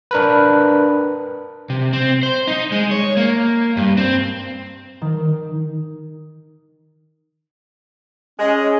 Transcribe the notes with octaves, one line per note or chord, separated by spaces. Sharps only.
D4 A#4 B4
C3
C4
C5
D#4
G#3
C#5
A#3
G2
C4
D#3
G#3 C#4